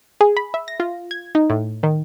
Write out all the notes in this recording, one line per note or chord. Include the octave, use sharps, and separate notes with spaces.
G#4
B5
E5
A#6
F4
G#6
D#4
A2
D#3